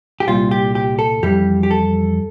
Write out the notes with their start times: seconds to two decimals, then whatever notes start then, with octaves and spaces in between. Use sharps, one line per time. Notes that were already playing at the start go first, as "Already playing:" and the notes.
0.20 G4
0.27 C2 A#2 G3 F4
0.51 G4
0.75 G4
0.99 A4
1.22 F2 E3 G3 G4
1.63 G4
1.71 A4